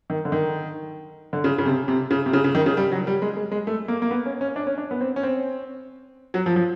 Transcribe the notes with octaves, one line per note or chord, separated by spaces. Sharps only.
D#3
D3
D#3
D3
C#3
C#3
C3
C3
C#3
C3
C#3
C#3
D#3
C#3
G3
F#3
G3
G#3
G#3
G#3
A3
A#3
A#3
B3
C#4
C#4
D4
C#4
D4
B3
C4
C#4
C4
F#3
F3
F3